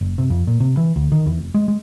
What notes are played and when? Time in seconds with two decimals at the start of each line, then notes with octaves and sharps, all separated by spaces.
0.01 F#1
0.18 C3
0.30 F2
0.47 A#2
0.60 C3
0.77 E3
0.96 D2
1.12 D#3
1.26 E2
1.39 F1
1.54 G#3
1.68 G#3